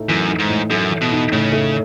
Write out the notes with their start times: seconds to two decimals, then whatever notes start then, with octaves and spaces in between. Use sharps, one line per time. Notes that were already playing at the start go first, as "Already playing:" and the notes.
Already playing: A2 A3 D#4
0.08 F#2 E3
0.29 D#4
0.39 G#2
0.49 A2
0.70 F#2 A3
0.90 E3
1.01 B2
1.12 D#4
1.32 A2 C#3
1.52 A3